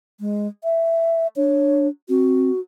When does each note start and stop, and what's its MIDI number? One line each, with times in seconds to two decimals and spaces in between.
0.20 0.47 56
0.64 1.27 76
1.36 1.88 62
1.36 1.87 73
2.09 2.50 60
2.09 2.60 66